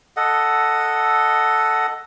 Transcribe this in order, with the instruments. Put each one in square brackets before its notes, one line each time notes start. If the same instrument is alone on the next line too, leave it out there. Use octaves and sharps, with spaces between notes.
[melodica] A4 D#5 F#5